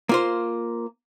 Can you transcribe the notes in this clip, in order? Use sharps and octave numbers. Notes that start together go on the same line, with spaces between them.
A#3 F4 C5